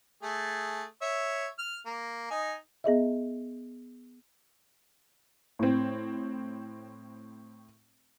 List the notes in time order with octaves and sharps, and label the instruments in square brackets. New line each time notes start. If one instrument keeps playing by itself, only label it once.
[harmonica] A3 G#4
C#5 E5
F6
A#3
D#4 G#5
[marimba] B3 G#4 D#5 E5
[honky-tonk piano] A2 C4